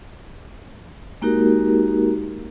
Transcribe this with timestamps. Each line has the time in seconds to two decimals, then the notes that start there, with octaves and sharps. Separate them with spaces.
1.21 G#3 A#3 D#4 F#4 G4 A#4